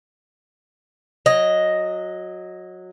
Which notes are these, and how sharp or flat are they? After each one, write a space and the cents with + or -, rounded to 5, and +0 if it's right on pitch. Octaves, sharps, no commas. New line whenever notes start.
F#3 -15 D#5 +0